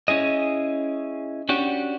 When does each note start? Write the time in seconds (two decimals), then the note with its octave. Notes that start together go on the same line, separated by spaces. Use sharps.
0.08 C#4 E4 G#4 D#5
1.49 C#4 D4 F#4 G4